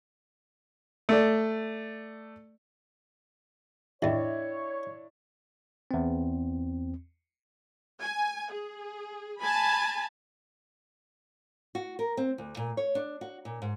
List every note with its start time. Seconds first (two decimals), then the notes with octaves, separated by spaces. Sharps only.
1.09 A3 D5
4.02 A1 E2 D4 E4 C#5 D#5 E5 G5
5.91 E2 C4
8.01 G#5
8.51 G#4
9.40 G#5 A5 B5
11.75 F#4
11.99 A#4
12.17 C4
12.38 D2
12.57 A#2
12.77 C#5
12.95 D4
13.21 F#4
13.45 A#2
13.62 G#2